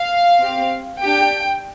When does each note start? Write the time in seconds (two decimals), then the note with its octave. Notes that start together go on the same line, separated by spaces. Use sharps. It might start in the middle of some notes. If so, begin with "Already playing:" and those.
Already playing: F5
0.41 C4 G4
1.01 D4 G4 G5